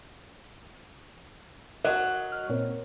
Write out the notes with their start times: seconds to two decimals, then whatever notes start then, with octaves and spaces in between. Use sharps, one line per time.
1.85 F#3 A#4 D#5
2.32 F6
2.49 A#2 C4 A#4 C#5